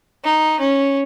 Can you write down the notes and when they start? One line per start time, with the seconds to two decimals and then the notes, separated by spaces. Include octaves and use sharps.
0.24 D#4
0.60 C#4